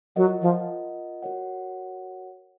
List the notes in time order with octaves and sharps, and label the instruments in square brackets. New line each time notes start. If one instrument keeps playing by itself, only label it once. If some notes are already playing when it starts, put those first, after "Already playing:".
[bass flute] F#3 [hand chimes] F4 A#4 D#5 F#5
[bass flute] F3
[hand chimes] F#4 A#4 C#5 F#5